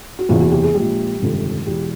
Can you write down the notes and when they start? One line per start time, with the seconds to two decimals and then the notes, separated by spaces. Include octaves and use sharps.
0.19 F#4
0.29 F#1 E2 C3 E3 F4
0.40 F#4
0.52 G4
0.63 G#4
0.74 A#1 A#2 F3 G#3 G4
1.20 G1 F2 C3 D#3 G#3
1.66 E1 E2 B2 G4